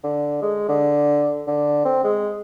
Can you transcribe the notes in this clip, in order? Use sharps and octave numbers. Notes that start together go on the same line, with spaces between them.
D3
G#3
D3
D3
C4
G#3